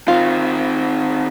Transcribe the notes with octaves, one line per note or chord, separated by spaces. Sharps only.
D#3 C4 F4